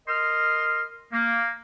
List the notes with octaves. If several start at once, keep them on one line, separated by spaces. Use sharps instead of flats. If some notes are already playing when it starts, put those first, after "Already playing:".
A#4 D#5 C6 F6
A#3